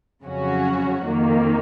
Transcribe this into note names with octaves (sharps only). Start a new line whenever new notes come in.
F2 C#3 F#3 C#4 F#4
F2 D#3 A#3